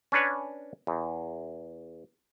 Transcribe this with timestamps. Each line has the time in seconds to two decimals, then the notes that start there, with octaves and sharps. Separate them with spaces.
0.12 C#4 D4 B4 C#5
0.87 E2